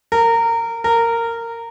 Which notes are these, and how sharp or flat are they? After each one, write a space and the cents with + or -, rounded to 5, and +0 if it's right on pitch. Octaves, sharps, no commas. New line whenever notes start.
A#4 -20
A#4 -15